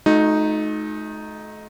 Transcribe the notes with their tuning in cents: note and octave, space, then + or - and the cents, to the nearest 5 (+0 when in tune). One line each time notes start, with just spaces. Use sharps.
A3 -40 D#4 +0 F#4 -40